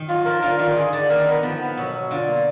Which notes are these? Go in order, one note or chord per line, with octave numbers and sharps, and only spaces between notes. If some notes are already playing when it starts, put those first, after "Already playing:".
Already playing: D#3
F#3 F4
F3 A#4
D3 F4
D#3 F4
D3 G#4
D3 D5
D#3 A#4
B3
F3 B3
B3
B2 F#3
F#3
D3 F4
A#3